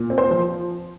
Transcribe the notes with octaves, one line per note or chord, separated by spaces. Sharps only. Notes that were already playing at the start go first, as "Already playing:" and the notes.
Already playing: A#2
C4
C5
F3